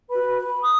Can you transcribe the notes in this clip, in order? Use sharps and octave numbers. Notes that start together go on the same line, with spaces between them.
F#4 B4 B5
B5
D#6